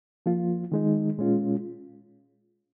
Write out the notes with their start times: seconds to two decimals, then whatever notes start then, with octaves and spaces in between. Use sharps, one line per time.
0.26 F3 A#3 F4
0.72 D#3 G#3 D#4
1.18 A#2 G#3 C#4 F4